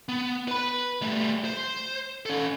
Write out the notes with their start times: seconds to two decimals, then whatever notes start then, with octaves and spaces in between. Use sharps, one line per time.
0.09 B3
0.48 B4 B5
1.02 G3 A3
1.45 C5
2.26 C#4 A4